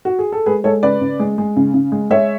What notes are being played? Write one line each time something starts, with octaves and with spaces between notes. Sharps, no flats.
F#4
G#4
A4
G#3 G#4 B4
G#3 A4 C#5
C#3 B4 D5
C#3
G#3
G#3
C#3
C#3
G#3
G#3 C#5 E5